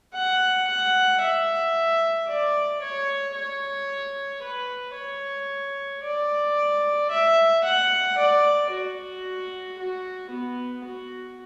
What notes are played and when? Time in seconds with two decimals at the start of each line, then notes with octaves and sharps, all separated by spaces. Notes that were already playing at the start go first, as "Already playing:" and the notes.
0.14 F#5
0.67 F#5
1.22 E5
2.28 D5
2.82 C#5
3.35 C#5
4.43 B4
4.95 C#5
6.03 D5
7.11 E5
7.64 F#5
8.18 D5
8.71 F#4
9.79 F#4
10.31 B3
10.85 F#4